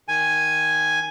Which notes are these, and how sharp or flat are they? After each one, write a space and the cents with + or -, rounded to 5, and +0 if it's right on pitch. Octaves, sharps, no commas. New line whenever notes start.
D#3 +0 G#5 +0